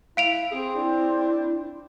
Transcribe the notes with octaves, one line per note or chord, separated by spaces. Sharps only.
E4 F5 D7 F7
C4 G#4
D4 E4